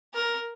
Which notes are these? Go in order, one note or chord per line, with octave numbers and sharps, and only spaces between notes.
A#4